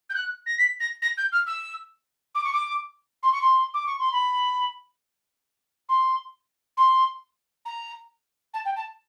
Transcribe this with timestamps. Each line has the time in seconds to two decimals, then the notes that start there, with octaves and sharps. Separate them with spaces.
0.10 G6
0.14 F#6
0.46 A#6
0.58 B6
0.80 A#6
1.02 A#6
1.17 G6
1.32 F6
1.47 E6
2.35 D6
2.44 C#6
2.53 D6
3.23 C6
3.32 C#6
3.41 C6
3.74 D6
3.86 C#6
3.99 C6
4.12 B5
5.89 C6
6.77 C6
7.65 A#5
8.54 A5
8.65 G5
8.76 A5